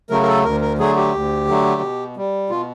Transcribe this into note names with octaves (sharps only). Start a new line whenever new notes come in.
C#3 F#3 A3 A#4
A#4
A4
D2 A#4
A#4
D3 F#3 A3 G#4
G4
D2
D3 F#3 A3
B2
G3
B2 F4